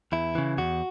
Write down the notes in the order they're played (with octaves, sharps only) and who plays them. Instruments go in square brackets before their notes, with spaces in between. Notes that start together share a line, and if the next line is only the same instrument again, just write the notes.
[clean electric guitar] E2 E4
C#3 E3
E2 F#4